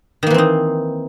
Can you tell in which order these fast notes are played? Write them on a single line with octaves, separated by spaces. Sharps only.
D#3 A#3 E3 C4 D#4